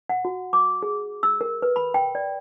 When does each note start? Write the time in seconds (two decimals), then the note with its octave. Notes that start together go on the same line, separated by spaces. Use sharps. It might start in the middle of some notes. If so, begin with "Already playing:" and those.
0.09 F#5
0.25 F#4
0.53 D6
0.83 G#4
1.23 E6
1.41 A#4
1.62 B4
1.76 B5
1.94 G5
2.15 D5